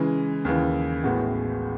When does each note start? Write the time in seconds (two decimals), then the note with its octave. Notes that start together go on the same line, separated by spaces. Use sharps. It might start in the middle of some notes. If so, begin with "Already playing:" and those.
Already playing: C#3 E3 G#3
0.45 D#2 C#3 E3
1.04 A1 A2 G#3 B3 F#4